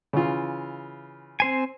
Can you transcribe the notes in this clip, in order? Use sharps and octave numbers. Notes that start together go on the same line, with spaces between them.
C#3 E3 F4
C4 C5 G#5